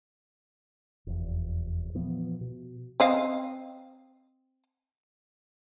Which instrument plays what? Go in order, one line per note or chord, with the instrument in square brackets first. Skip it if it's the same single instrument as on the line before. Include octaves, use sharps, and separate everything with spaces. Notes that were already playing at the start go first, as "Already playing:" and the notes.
[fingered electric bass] F1 E2
A#2 E3 F3 B3
B2
[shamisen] C4 D#5 F5